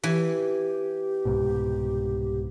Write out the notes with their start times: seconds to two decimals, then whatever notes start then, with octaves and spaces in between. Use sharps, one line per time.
0.03 E3 G4
1.25 C2 G#2 B2